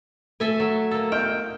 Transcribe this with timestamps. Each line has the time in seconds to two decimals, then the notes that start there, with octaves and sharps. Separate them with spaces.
0.40 A3 A4 E5 G#5
0.60 F#3
0.91 A#3 A4
1.12 D#5 G5 F6 G6